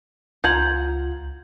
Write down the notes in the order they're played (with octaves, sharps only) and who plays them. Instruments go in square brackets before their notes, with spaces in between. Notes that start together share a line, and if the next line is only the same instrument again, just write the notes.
[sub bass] C#2 [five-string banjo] F4 F#5 A#5 [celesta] G6 G#6 F#7